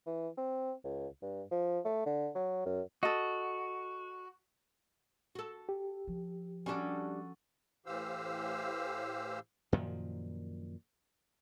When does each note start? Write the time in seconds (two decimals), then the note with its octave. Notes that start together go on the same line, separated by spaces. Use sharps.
0.07 E3
0.37 C4
0.84 C#2
1.22 G2
1.51 F3
1.85 A3
2.06 D3
2.35 F#3
2.66 F#2
3.03 F#4 A4 D#5
5.35 F#4 A4
5.69 G4
6.07 F3
6.66 G3 C#4 D4 F#4 A4
7.86 A2 E3 G4 C5 F5 E6
9.72 F#2 A#2 D#3 F3